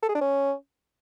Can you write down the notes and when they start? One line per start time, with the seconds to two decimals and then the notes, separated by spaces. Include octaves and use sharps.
0.03 A4
0.09 G#4
0.15 D4
0.21 C#4